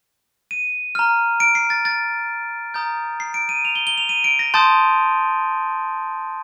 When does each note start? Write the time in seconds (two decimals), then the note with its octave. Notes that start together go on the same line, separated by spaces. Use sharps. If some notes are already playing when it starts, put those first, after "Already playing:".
0.51 D#7
0.95 A#5 F6
1.40 D7
1.55 C7
1.70 A6
1.85 A6
2.74 A#5 D#6 G6
3.20 C7
3.34 D7
3.49 D#7
3.65 F7
3.75 G7
3.87 G7
3.98 F7
4.09 D#7
4.24 D7
4.39 A#6
4.54 A5 C6 D#6 G6 A6